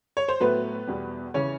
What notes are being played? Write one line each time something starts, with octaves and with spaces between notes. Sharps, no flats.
C#5
C5
A2 F#3 A3 B3 B4
E2 B2 G3
C#3 E3 C#4 C#5